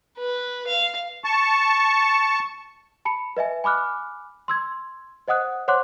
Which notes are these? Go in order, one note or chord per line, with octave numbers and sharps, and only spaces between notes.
B4
F5
A5 C#6
A5 B5 C#7
B4 D#5 E5 G#5
G#5 B5 D6 F6 F#6
C6 E6 G#6
C5 D#5 F#5 D#6 F#6
C5 C#5 F#5 C6 D6 F#6